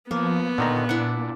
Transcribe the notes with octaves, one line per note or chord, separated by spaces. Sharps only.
F3 A#3 B3
A#2 D3 D#3 A#5
D4 E4 F#5